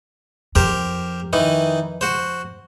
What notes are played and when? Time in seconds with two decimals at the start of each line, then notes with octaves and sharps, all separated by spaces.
0.55 F2 G4 A#4 C5
1.33 D#3 E3 D#4
2.01 F#4 C5